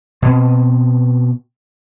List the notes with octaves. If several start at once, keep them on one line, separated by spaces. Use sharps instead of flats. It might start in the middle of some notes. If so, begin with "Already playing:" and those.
B2 C4